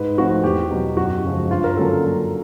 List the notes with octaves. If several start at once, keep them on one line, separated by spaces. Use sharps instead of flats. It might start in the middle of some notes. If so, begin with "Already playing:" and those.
Already playing: G#2 B4
F3 A3 C4 F#4
E2 G4
B2 F#3
F#2 F#4
C#3 F3 G#3
G2 F4
A#4
D3 F#3 A#3 C#4 A4